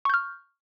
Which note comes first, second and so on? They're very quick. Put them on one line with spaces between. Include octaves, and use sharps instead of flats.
C#6 G6 F6